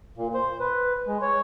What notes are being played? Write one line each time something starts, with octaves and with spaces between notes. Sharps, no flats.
A#2
C5
B4
G#3
C#5